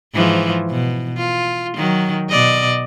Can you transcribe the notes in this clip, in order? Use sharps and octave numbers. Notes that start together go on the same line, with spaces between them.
G#2 E3 F3
B2
F4
D#3 F#3
B2 D5 D#5